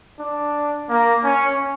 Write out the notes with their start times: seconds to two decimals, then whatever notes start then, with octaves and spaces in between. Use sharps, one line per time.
0.19 D4
0.89 A#3
1.24 C#4